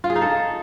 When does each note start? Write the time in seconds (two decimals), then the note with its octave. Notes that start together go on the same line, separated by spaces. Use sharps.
0.04 F4
0.10 G#4
0.16 D#4
0.21 A4